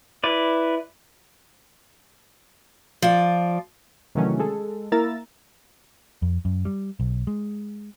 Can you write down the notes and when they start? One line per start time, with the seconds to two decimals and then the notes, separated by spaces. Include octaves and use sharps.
0.24 E4 B4 D5
3.02 F3 D5
4.15 C3 D#3 E3 F#3 A3 C#4
4.39 G#3 A4
4.92 A#3 E4 A#4 A#5 E6 A6
6.22 F2
6.45 F#2
6.65 G3
7.00 B1
7.27 G#3